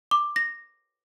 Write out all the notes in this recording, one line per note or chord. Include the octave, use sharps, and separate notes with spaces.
D6
A#6